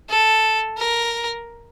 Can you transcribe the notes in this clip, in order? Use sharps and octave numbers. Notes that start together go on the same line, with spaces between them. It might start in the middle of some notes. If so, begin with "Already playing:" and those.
A4
A#4